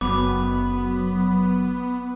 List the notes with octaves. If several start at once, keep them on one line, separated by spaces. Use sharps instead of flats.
F#1 F#3 B3 B5 D6